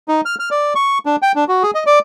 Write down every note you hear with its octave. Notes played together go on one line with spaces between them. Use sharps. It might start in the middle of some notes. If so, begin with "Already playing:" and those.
D#4
F6
F6
D5
C#6
D4
G5
D4
F#4
G#4
D#5
D5